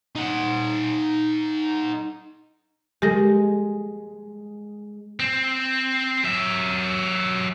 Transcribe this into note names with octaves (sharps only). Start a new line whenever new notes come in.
D#4 F#5
G#3 G4 A4 A#6
C4
F#3 E5